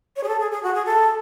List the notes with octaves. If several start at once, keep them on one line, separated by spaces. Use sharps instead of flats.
C#5
G#4
A4
G#4
G#4
F#4
G#4
A4